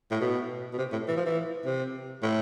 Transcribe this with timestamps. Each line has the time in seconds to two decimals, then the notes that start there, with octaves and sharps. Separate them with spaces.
0.11 A2
0.21 B2
0.73 B2
0.78 C3
0.92 A2
1.08 E3
1.17 F3
1.26 E3
1.65 C3
2.22 A2